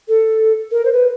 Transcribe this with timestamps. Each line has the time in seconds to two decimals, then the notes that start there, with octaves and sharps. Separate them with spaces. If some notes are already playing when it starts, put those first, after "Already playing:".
0.08 A4
0.71 A#4
0.85 C5
0.93 B4